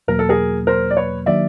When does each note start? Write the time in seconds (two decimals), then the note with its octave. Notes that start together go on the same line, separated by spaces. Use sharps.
0.08 E2 B2 F#3 A#3 A#4
0.19 A4
0.29 G#4 A#4
0.67 A#4 C5
0.91 D5
0.97 B4 C#5
1.26 D#3 F#3 A#3 D4 D5 E5